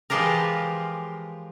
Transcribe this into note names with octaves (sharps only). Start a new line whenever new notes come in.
E3 F3 G#3 F4 G4 A#4